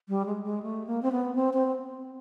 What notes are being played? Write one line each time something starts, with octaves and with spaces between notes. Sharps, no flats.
G3
G#3
G#3
A3
A#3
C4
B3
C4
C4